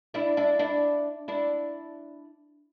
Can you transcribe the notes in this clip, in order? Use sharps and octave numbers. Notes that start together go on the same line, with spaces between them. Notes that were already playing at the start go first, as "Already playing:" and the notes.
D4 E4
D4 E4
D4 E4
D4 E4